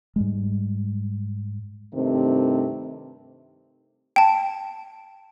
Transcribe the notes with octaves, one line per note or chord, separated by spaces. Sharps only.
G#2 G3 G#3
G2 C3 D#3 A3 C4
G5 A5